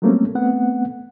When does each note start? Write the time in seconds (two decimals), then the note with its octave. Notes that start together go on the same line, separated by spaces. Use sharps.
0.02 F#3 G3 A3 A#3 C4 C#4
0.35 A3 B3 C4 F#5